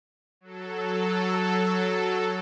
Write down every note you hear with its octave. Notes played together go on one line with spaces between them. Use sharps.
F#3 A4